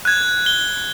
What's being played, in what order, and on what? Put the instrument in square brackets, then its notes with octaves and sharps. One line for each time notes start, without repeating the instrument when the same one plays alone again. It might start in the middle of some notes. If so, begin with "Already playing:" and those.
[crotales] F#6 G#6
G7